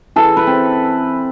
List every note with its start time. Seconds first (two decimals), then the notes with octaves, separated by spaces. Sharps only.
0.16 E3 A4
0.37 B4
0.47 C4